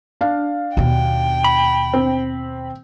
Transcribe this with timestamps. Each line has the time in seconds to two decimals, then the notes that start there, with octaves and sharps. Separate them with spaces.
0.21 D4 F5
0.77 D#2 B2 G5
1.44 B5
1.93 C4